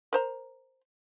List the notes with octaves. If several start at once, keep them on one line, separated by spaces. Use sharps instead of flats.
A#4 C5 A#5